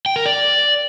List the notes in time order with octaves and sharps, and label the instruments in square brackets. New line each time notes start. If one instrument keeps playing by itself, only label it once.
[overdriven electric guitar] G5
A#4
D5